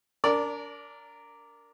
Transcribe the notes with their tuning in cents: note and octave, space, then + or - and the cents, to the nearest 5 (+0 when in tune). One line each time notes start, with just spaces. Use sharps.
D4 -30 A#4 -10 D5 -5